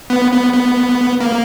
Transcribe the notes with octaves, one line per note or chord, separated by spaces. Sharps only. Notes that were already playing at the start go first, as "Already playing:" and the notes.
B3
B3
B3
A#3